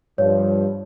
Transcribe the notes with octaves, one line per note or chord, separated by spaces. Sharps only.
G2 F3 C#5